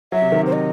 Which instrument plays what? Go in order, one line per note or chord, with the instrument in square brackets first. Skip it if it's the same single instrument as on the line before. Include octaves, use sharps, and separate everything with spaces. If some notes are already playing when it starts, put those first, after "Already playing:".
[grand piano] F#3 [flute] E5
[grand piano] C3
D#3
[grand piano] C3 [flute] C5
[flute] D#5